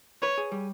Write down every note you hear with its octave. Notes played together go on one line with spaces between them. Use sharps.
B4 C#5
G#4
G3